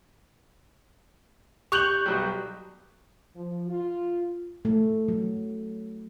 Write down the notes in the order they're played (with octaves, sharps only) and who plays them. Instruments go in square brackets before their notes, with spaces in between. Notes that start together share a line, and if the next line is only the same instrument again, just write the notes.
[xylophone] G4 F#6 F7 [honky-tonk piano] C#6 G6 F#7
[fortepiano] B1 F#3 G3
[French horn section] F3
F4
[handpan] A3
F#3